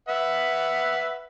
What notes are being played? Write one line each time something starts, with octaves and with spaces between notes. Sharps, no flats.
B4 E5 F#5